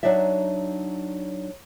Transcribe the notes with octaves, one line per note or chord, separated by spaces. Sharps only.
F#3 D4 D#4 D5 E5